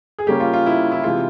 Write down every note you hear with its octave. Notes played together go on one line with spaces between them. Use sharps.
G#4
C#3 G3 A#3 C#4 G4
F4
F4
E4
E4
C3 E3 G#3 F4